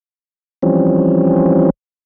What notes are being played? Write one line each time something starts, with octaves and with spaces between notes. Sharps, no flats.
E3 F3 G3 C4 C#4